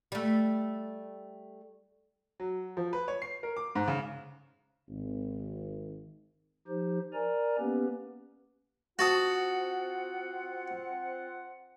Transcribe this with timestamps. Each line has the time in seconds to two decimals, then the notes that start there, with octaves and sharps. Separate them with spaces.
0.12 G3 A3
2.40 F#3
2.77 F3
2.93 B4
3.08 C#5
3.22 C7
3.43 A#4
3.57 D6
3.75 G#2
3.88 C#3
4.89 G#1
6.68 F3 D#4 G4 C5
7.13 A#4 D5 G#5 A#5
7.59 A#3 B3 C#4 G4 B4
8.99 C4 F4 F#4 F#5 A5 D#6